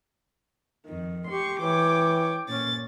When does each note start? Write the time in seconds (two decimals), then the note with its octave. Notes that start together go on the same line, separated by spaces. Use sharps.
0.86 F2 D#3
1.29 G4 C6 C#6
1.61 E3 C#5 G5 D6
2.48 A#2 C#4 A6